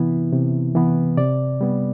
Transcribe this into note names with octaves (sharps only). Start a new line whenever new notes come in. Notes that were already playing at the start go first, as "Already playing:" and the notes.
Already playing: C3 E3 B3 E4
C3
E3 B3
C3 D5
G3 B3